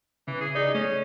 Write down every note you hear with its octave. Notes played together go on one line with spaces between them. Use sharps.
C#3 E3
G#4
D#4 G#4 D5
A3 C#4